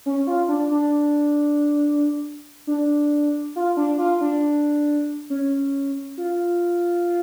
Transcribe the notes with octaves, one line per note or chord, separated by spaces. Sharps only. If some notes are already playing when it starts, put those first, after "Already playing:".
C#4
F4
D4
D4
D4
F4
D4
F4
D4
C#4
F4